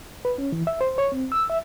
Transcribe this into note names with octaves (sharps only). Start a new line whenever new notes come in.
B4
C#4
E3
E5
C5
C#5
C4
E6
E5